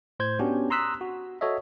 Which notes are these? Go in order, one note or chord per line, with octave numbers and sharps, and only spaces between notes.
A2 C5 G6 G#6
B3 C#4 D4 F#4 G4
A#5 C6 D#6 E6 F#6 B6
F#4
F#4 A4 C#5 D#5 E5